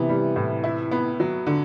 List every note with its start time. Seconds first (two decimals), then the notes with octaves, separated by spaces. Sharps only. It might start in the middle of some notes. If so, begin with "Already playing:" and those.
Already playing: C3 E3 B3
0.09 G3
0.36 A2
0.64 E4
0.91 B3
1.20 F#3
1.46 D3